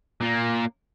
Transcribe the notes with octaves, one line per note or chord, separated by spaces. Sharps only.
A#2 A#3